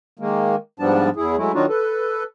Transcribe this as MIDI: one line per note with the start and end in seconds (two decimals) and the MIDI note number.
0.19 0.56 51
0.19 0.56 56
0.19 0.56 58
0.80 1.09 44
0.80 1.09 53
0.80 1.09 55
0.80 1.09 59
0.80 1.09 62
0.80 1.09 81
1.16 1.37 40
1.16 1.37 64
1.16 1.37 68
1.37 1.52 54
1.37 1.52 56
1.37 1.52 57
1.37 1.52 64
1.54 1.66 51
1.54 1.66 54
1.54 1.66 62
1.54 1.66 63
1.54 1.66 65
1.54 1.66 66
1.69 2.24 69
1.69 2.24 71